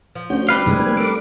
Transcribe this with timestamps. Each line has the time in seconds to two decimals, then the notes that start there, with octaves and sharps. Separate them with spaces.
0.15 F3
0.30 D2 C#4 F#4 G6
0.49 G3 B4 F5
0.66 F1 D2 G2 C3 E3 G#3 D#5
0.78 A#3 C4 G#5
0.97 D4 A4 A#4 D6